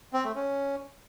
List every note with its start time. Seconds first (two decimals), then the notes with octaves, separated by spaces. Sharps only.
0.13 C4
0.24 A3
0.36 C#4